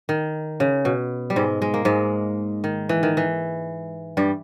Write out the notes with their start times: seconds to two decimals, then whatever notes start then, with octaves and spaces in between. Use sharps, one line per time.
0.09 D#3
0.60 C#3
0.85 B2
1.30 G3
1.36 G#2 G#3
1.62 G#3
1.74 A#3
1.85 G#2 G#3
2.64 D#3
2.89 E3
3.03 D#3
3.17 E3
4.17 G2 G3